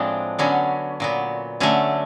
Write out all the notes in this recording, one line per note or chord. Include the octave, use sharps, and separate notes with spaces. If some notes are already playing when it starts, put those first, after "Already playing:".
Already playing: A2 F3 G#3 C4 D4
D3 F#3 B3 C#4
A#2 F#3 B3
D3 F#3 A3 C#4